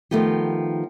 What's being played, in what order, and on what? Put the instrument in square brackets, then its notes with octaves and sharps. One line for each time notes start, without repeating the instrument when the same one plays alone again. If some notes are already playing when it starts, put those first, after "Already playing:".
[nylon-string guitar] D#3 F3 A3 B3 G4